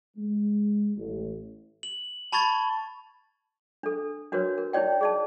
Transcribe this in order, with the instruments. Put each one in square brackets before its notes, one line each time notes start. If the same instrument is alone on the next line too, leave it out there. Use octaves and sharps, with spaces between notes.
[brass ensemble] G#3
A1
[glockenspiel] F#7
A5 B5 C#6 G#6 A6
[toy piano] D4 A4
D4 F#4 A#4 B4 C#5
A#4
D#4 E4 C#5 D5 G5
G#4 D5 A5